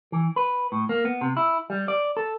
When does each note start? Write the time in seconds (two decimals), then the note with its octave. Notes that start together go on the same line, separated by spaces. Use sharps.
0.12 E3
0.36 B4
0.72 A2
0.89 A#3
1.05 B3
1.21 C3
1.37 E4
1.70 G3
1.88 D5
2.17 A4